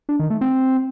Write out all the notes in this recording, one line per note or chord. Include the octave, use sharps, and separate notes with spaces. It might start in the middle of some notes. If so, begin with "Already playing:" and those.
D4
D#3
A3
C4